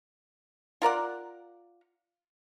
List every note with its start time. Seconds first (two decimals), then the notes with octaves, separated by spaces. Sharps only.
0.82 F4 A#4 D5 F#5